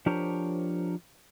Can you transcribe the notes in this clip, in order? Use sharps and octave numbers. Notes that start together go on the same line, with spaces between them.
F3 D4 G4 A#4 C5 C#5